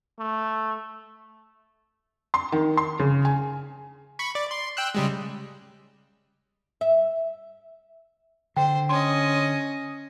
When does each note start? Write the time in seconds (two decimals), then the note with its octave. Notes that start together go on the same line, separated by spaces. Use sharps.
0.19 A3
2.34 C6
2.52 D#3
2.77 C6
2.99 C#3
3.25 G#5
4.19 B5 C#6
4.35 D5
4.51 C6
4.77 G5 E6 F#6
4.95 C#3 G3 G#3
6.81 E5
8.57 D3 C5 G5
8.89 C#4 D#5 C6